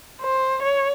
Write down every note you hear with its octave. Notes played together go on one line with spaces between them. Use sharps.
C5
C#5